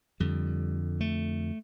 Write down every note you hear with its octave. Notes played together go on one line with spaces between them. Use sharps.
F2 D3 G3
A3